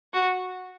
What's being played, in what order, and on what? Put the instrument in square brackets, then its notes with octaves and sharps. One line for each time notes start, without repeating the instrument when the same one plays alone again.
[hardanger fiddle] F#4